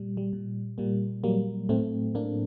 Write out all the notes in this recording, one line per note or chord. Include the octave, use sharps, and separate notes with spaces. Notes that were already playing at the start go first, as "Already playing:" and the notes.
Already playing: A#2 G3
G3
A#2
A#2 G3 A#3
F#3 G3 A#3
A2 A3 C4
A2 A#3 D4